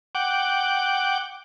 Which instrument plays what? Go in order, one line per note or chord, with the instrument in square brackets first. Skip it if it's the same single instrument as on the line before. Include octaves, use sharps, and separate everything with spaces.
[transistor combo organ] F#5 G5 D6